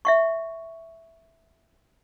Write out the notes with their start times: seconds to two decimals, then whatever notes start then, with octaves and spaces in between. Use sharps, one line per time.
0.05 E5 F#5 C#6